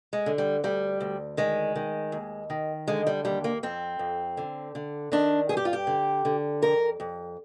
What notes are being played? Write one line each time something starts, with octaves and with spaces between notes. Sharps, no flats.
G#3
D3
G3
D2 G3
D2
D#3 G#3
D#3
D#2
D#3
D3 G#3
G3
D#2 G3
A#3
F2 C4
F2
D3
D3
D#3 D4
G2 G#4
G4
F4
G4
D3
D3
F2 A#4
F2